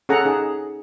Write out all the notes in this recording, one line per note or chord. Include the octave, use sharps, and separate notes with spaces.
C#4 G#4 A4 F#5 A#5
D#4 G#4